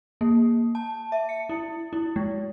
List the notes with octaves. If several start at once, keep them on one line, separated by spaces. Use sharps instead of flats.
A#3
A5
E5
C#7
E4
E4
G#3